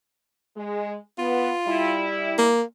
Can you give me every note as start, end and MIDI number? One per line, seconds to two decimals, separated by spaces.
0.57 0.96 56
1.19 1.52 59
1.19 2.07 65
1.68 2.52 55
1.68 2.52 64
2.38 2.62 58